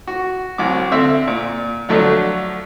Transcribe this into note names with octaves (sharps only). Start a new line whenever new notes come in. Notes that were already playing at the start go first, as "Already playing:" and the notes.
F#4
C2 F#3 D6
D3 C4 E5
A#2
D3 F3 F#3 A3 D4